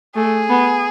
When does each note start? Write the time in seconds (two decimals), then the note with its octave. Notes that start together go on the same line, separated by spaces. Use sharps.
0.15 A3 G#4
0.50 B3